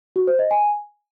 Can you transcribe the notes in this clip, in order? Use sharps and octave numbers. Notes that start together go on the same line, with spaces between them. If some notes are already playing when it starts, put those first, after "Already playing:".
F#4
C5
D#5
G#5